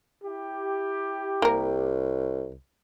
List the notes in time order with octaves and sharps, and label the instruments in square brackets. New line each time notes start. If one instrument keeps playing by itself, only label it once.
[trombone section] E4 G4
[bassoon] C2 [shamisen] A#3 A#4